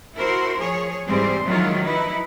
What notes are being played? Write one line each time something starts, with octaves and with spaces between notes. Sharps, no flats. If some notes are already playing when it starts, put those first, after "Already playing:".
E4 F#4 A#4 C5
F3 G#4 C#5
G#2 E3 G3 C4 G#4 C5
D#3 F3 F#3 G#3 E4 F4
D#4 E4 B4